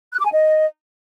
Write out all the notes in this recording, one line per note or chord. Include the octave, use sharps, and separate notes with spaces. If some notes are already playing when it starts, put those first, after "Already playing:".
F#6
D6
G#5
D#5